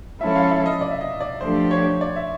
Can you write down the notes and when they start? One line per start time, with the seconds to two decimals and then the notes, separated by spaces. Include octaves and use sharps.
0.21 F3 G#3 C#4 E4 A4 E5
0.36 F5
0.50 E5
0.66 D#5
0.81 D5
0.91 E5
1.01 D#5
1.20 D5
1.41 F3 A3 D4 G4 C5
1.71 C#5
2.01 D5
2.16 E5